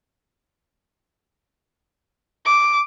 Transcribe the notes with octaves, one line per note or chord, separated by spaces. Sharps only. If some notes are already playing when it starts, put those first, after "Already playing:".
D6